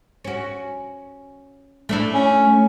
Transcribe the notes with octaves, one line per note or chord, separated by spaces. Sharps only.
C#4 F#4
A3 D4 E4
C#4